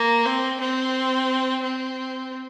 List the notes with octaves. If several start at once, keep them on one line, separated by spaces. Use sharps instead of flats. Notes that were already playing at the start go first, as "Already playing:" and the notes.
Already playing: A#3
C4
C4
C4